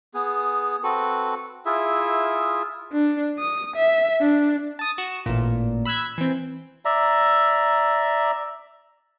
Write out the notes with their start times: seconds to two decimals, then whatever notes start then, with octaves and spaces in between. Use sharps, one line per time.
0.14 B3 G#4
0.83 C4 F#4 A4 B4
1.66 E4 F4 G#4 E5
2.92 D4
3.39 D#6
3.76 E5
4.21 D4
4.79 A5 D#6
4.98 F#4 E7
5.26 A1 A#2
5.85 B5 E6 F#6 G#6 B6
6.18 E3 C4
6.85 D5 E5 A#5